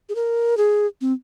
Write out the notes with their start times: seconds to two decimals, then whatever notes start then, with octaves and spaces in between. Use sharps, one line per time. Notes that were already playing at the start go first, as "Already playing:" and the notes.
0.09 G#4
0.15 A#4
0.57 G#4
1.01 C4